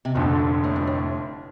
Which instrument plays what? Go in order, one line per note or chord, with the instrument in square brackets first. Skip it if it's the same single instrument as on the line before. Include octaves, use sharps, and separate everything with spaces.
[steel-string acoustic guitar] C3
[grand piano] F1 F2 D3 [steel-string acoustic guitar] A#2
[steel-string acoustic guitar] A2
G2
A2